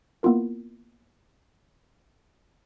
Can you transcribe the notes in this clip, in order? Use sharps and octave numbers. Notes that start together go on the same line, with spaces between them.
A#3 B3 E4 F4 A#4